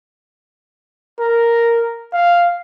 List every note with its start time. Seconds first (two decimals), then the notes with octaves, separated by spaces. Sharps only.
1.19 A#4
2.13 F5